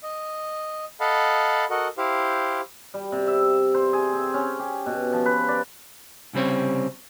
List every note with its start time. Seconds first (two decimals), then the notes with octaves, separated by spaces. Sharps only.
0.03 D#5
1.00 A4 D#5 F5 F#5 A5 B5
1.70 F#4 A4 A#4 D#5 F#5
1.98 E4 G4 C5 F5
2.94 G3
3.12 C3
3.28 E5
3.74 C5
3.93 G#4
4.13 C4
4.34 C#4
4.59 G4
4.86 B2
5.12 F3
5.26 B4
5.48 D5
6.33 C2 C#3 G3 C4 C#5